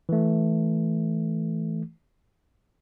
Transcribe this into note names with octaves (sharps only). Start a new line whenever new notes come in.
E3 A3